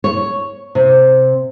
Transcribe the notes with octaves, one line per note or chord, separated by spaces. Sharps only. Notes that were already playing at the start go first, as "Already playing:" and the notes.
C#5
C3